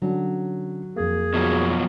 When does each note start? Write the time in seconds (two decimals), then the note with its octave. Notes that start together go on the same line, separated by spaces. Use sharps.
0.02 D3 F#3 C#4 D4
0.96 F2 A#3 G#4
1.34 B2 F3 F#3